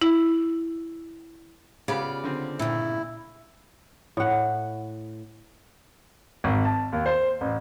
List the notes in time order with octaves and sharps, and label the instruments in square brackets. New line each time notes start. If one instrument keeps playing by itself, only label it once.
[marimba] E4
[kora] C#3 B3 G4 [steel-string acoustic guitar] F4 D5
[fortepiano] D3 C4
[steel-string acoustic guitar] G2 A#2 [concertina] E4
[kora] A2 F#5
[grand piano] G#1
A5
D#2
C5
A1